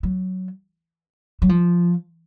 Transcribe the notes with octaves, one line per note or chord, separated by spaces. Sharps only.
F#3
F#3
F3